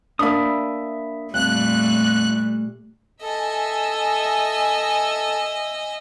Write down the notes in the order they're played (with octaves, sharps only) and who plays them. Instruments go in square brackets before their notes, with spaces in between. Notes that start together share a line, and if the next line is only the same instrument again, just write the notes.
[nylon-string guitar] A#3 D4 [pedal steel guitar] E5 B5 D#6
[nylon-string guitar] F2 [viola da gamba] A#2 G3 A3 [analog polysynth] F#6
[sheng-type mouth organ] A4 [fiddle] D#5 [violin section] E5 G#5 E6